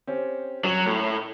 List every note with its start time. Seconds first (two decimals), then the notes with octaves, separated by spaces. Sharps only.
0.07 C4 C#4 G4
0.64 F#3 C#4 F7 F#7
0.86 A2